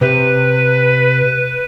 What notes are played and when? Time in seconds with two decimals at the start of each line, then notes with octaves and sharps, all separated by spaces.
0.01 C3 G4 B4